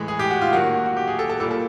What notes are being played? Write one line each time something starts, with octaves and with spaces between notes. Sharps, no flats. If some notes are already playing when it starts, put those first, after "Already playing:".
Already playing: A2 E3 G#3
G#4
G4
F#4
F4
D#3 F#3 A#3 F#4
F#4
G4
G#4
A4
A4
A#2 G3 A#3 A4
A4